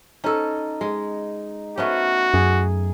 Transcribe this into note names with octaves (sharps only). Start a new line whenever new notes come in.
C#4 D#4 A4 D#5
G#3
A3 B3 C#4 F#4
F#2 G#4